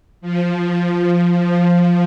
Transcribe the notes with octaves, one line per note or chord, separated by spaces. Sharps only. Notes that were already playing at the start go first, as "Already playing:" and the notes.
F3
F3
F3